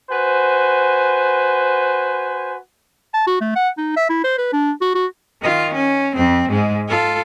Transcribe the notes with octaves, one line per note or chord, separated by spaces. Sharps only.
F#4 B4 C5 G#5
A5
F#4
A3
F#5
D#4
E5
E4
C5
B4
D4
F#4
F#4
D#3 F4
C#4
F2 C4
G#2 G#3
F4 A4